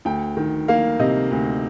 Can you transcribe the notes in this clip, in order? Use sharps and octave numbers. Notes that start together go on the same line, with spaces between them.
D2 G5
D#3
A#3 F5
C3 D#5
D2